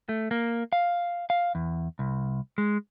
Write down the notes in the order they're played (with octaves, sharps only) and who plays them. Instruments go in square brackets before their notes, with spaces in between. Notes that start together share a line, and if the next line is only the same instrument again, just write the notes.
[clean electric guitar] A3
A#3
F5
F5
E2
C2
G#3